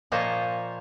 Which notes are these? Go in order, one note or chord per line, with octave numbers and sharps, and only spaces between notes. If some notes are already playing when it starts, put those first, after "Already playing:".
A#2 F3 A#3 C5 C#5 D#5